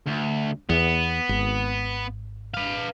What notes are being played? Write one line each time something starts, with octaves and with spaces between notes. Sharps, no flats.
D2
E2 B3
G#1
B4 F5